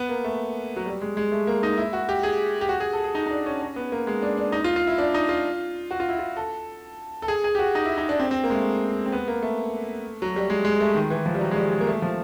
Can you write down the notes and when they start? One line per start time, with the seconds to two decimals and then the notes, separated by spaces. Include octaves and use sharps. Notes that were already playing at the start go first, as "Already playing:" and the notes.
Already playing: B3
0.09 A#3
0.24 A3
0.76 F#3
0.86 G3
1.02 G#3
1.17 G#3
1.32 A3
1.47 A#3
1.63 D#4
1.78 E4
1.93 F#4
2.09 G4
2.23 G#4
2.61 G4
2.69 F#4
2.80 G#4
2.93 A4
3.04 G#4
3.15 D#4
3.26 D#4
3.31 D4
3.46 C#4
3.62 C#4
3.76 B3
3.92 A#3
4.07 G#3
4.22 D4
4.37 D4
4.52 D#4
4.64 F4
4.76 F4
4.87 E4
4.98 D4
5.14 D#4
5.29 F4
5.91 F#4
6.00 F4
6.09 E4
6.19 F4
6.37 A4
7.22 A4
7.28 G#4
7.44 G#4
7.55 G4
7.59 F#4
7.75 D#4
7.86 E4
7.98 D#4
8.09 D4
8.19 C4
8.31 C4
8.44 A#3
8.50 G#3
8.54 A3
9.06 C4
9.12 B3
9.28 A#3
9.42 A3
10.22 F#3
10.36 G3
10.50 G#3
10.65 G#3
10.80 A3
10.95 D#3
11.10 E3
11.26 F3
11.35 G3
11.41 F#3
11.51 G#3
11.57 G3
11.72 G#3
11.80 A#3
11.87 A3
12.02 F3